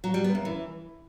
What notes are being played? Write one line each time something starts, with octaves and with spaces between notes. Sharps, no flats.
F#3
G3
B3
F#2
E3